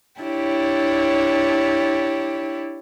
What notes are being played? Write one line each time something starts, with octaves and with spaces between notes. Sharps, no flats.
D4 E4 G4 C#5